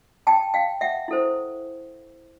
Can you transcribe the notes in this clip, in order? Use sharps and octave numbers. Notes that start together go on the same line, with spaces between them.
G5 A5
F5 G5
E5 F#5
E4 A4 C5